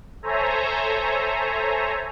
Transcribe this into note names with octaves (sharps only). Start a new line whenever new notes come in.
A4 C5 C#5 E5 G#5 A#5